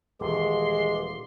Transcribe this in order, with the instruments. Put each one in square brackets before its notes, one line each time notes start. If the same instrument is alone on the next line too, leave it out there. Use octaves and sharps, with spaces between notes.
[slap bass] D#1 D#3 [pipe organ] E3 G4 [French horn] G#3 [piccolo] C6